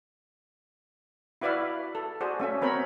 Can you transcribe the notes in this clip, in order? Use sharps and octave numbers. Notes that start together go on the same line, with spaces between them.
E4 F#4 B4 D5 E5 F5
A4
F#4 G#4 C5 D5
A3 C#4 E5
B3 C4 A#4 C#5 B5